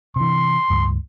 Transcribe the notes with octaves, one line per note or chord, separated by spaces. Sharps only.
C3 E3 C6
C#2 G2